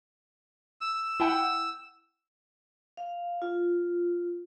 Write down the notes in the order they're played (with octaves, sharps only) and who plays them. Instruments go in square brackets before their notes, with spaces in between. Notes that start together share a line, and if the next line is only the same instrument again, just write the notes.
[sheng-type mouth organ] E6
[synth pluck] E4 F#5 G5
[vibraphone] F5
F4